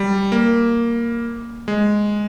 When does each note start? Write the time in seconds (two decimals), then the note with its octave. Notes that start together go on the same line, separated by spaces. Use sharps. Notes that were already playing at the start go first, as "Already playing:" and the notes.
Already playing: G3
0.32 A#3
1.68 G#3